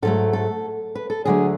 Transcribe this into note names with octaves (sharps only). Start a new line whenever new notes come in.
G#2 F#3 A3 A4
A4
B4
A4
D2 D3 F#3 A3 G#4